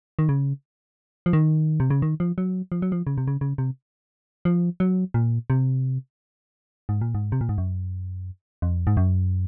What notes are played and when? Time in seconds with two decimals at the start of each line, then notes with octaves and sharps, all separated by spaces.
0.19 D#3
0.29 C#3
1.26 F3
1.33 D#3
1.80 C3
1.90 C#3
2.02 D#3
2.20 F3
2.38 F#3
2.72 F3
2.82 F#3
2.92 F3
3.07 C#3
3.18 C3
3.28 C#3
3.41 C#3
3.58 C3
4.45 F3
4.80 F#3
5.14 A#2
5.50 C3
6.89 G#2
7.01 A#2
7.15 G#2
7.32 C3
7.41 A#2
7.49 G#2
7.58 F#2
8.62 F2
8.87 G#2
8.97 F#2